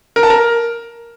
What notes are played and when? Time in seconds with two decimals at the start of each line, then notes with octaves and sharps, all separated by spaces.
0.16 A#4
0.23 A5
0.30 A#4